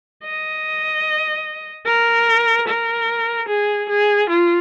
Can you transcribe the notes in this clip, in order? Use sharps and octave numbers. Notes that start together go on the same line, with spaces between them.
D#5
A#4
A#4
G#4
G#4
F4